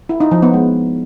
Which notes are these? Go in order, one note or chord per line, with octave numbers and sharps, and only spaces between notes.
E4
D#4
F3
B3
G#3